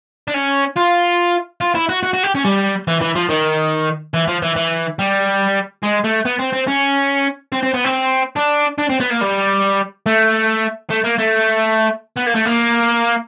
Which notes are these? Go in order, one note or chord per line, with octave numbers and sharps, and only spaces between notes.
D4
C#4
F4
F4
E4
F#4
F#4
F#4
G4
C#4
G3
E3
E3
F3
D#3
E3
F3
E3
E3
G3
G#3
A3
B3
C4
C4
C#4
C4
C4
B3
C4
D4
D4
C4
B3
A#3
G3
A3
A3
A#3
A3
B3
A#3
A3
A#3